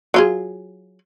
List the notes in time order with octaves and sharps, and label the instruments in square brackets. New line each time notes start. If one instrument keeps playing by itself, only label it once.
[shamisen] F#3 F4 G#4